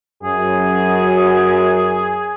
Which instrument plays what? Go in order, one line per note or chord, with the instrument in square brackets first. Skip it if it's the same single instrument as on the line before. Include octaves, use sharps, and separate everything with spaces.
[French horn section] F#2 [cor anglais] G#4